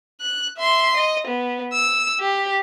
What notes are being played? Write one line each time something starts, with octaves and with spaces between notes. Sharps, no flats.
F#6
E5 C6
D#5
B3
E6
G4